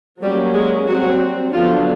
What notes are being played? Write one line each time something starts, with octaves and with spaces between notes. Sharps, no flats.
F#3 G3 A#3 C#4 G4
G#3 G#4
F#3 G3 C4 F#4
D3 F3 F#3 B3 D4 F4